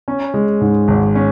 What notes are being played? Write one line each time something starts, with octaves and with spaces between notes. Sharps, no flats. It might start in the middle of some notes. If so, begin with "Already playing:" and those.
C#4
G#3
G#2
G#1
C#4